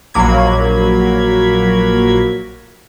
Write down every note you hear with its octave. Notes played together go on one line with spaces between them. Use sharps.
A#1 F#3 A#3 B5 G#6